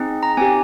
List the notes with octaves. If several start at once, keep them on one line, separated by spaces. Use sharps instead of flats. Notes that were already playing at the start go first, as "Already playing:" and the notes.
Already playing: C4 D#4 G#4
A#5
C4 D#4 G4 G#5